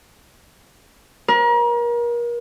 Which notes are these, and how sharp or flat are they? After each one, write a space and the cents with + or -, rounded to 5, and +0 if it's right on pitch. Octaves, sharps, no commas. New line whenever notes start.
A#4 +35